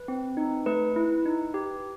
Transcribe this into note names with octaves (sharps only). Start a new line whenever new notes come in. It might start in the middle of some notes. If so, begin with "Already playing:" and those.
Already playing: B4
C4
D#4
A3 B4
E4
D#4
G4